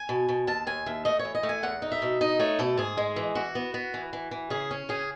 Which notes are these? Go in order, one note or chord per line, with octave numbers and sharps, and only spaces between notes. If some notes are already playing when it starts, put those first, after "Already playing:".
Already playing: G#5
B2
B2
D#2 A5
D#2 G#5
D#2 E5
A3 D#5
C#5
E3
D#5
A3
G#5
E2 F#5
D#4
E5
B2
D#4 D#5
A3 C#5
B2 A4
G#2 G#4
G#3
E3
E3 F#4
B3
B3
E3
E3
E3
C#3 G#4
C#4
C#3 G#4